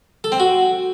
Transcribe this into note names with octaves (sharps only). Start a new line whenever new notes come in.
A4
C4
F#4